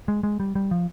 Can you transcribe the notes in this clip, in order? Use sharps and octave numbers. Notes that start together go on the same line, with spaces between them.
G#3
G#3
G3
G3
F3